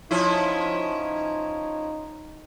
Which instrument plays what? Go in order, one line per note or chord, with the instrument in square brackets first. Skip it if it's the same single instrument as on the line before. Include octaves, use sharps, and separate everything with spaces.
[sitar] F3 C#4 E4 [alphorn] D#4